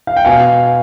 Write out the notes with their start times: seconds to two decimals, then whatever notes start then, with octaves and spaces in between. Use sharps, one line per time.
0.07 F5
0.16 G5
0.25 B2 F5 G#5